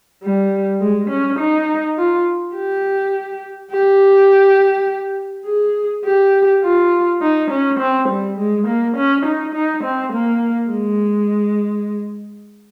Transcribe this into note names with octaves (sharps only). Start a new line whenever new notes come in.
G3
G#3
C#4
D#4
F4
G4
G4
G#4
G4
F4
D#4
C#4
C4
G3
G#3
A#3
C#4
D#4
D#4
C4
A#3
G#3